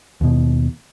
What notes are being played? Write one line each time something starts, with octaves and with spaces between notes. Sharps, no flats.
D#2 B2